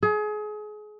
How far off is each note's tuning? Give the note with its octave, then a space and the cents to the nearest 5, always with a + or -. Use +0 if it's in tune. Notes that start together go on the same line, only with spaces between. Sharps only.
G#4 +30